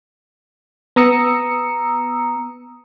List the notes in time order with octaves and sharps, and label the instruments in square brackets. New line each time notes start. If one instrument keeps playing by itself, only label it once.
[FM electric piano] B3 A#5 D#6 E6 C#7